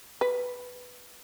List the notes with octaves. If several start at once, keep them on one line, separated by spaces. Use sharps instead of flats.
B4